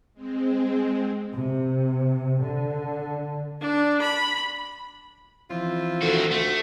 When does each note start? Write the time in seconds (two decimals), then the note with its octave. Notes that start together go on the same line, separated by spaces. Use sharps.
0.14 G#3 C4
1.33 C3
2.41 D3
3.62 D4
4.01 B5
5.50 E3 F3 C4 F4
6.02 D2 D#3 F#4
6.31 D2 A3